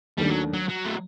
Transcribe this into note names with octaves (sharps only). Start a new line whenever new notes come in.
D#2 D#3 G3 A3 D4
F#3
F#3
F#3
A3